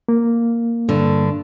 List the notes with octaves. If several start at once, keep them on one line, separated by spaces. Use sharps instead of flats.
A#3
G2 D3